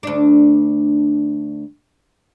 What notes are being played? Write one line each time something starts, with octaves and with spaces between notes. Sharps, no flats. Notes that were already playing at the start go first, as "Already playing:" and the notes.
D2 D4